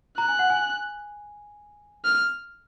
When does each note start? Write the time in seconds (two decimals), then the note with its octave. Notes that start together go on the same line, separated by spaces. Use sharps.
0.18 A#5 F#6
0.29 G#5
0.39 F#5
0.50 G#5
2.04 F6